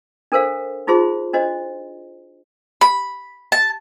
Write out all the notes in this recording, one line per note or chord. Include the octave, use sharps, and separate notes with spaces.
D4 A4 A#4 C5 F5
D#4 F4 G#4 C5 C6
D4 F#4 C5 D#5
B5
A5